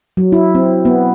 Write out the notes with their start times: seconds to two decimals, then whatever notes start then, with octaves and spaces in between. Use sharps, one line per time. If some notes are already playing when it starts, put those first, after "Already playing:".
0.17 F#3
0.32 E4
0.55 C4
0.85 B3